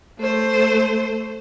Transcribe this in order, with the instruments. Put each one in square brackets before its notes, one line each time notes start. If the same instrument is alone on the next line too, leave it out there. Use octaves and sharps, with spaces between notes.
[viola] A3 C5